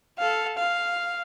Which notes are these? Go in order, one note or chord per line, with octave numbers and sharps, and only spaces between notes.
A4 F5
F5